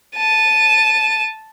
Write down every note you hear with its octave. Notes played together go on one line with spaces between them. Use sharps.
A5 D#7